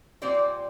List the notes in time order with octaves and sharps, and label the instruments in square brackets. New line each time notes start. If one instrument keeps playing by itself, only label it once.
[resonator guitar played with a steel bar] A#2 G3 C4 C5 D5